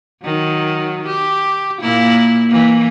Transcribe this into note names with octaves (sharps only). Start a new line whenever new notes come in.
D#3 F#3
G4
A#2 A#3 E4
E3 A#3